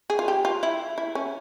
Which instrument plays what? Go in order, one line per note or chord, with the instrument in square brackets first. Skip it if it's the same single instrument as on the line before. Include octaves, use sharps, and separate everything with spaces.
[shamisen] G#4
F4
G4
F4
E4
E4
C#4